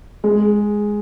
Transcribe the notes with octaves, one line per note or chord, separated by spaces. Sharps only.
G#3